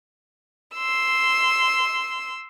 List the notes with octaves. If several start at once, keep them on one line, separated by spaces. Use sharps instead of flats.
C6 E6